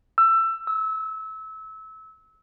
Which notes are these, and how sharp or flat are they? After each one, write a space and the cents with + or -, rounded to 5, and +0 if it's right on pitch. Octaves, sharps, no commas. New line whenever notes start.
E6 +20
E6 -25